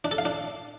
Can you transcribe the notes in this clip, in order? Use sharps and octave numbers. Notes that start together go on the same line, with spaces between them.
D4
A4
F5
D4